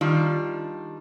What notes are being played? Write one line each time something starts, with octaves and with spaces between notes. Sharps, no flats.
D#3 G3 D4 F4